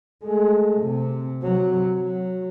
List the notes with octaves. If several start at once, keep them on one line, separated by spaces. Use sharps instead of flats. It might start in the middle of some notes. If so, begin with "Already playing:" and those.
G#3 A3
C3
C3 F#3
F#3